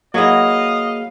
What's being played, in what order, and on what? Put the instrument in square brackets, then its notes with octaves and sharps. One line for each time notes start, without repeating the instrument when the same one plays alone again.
[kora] F#3 E4 [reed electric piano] A#3 G#4 [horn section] D#5 [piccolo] F5